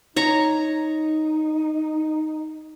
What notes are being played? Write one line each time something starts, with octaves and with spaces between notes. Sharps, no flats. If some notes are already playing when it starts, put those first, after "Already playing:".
D#4 C#5 A#5 C#6